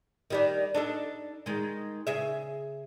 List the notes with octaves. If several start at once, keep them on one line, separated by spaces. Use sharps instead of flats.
D#3 G3 D4
D4 D#4 A4
D#3 G#3
C#3 G#4 E5